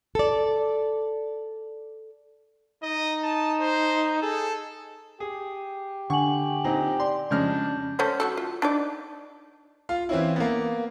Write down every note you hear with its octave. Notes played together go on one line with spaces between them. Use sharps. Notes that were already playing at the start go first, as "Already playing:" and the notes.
A4 D5
D#4 D#5
A5
C5
G#4 A4
G4 G#4
D3 F#5 G#5 C#6 F#7
A#2 C4 D#4
D5 C6
F2 C#3 G#3 D4 F6 G6
A3 C#4 C5
F#4 G4 A4
F4
D4 D#4 D5
F4 F5
E3 C4 C#4 E4
A#3 B3